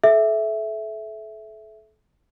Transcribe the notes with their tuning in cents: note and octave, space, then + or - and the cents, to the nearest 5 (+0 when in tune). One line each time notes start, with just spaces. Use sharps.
A4 -35 E5 +0